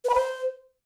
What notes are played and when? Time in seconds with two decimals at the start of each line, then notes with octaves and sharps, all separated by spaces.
0.04 B4
0.09 B5
0.14 C5